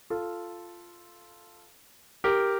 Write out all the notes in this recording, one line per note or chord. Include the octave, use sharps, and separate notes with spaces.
F4 A4
G4 A#4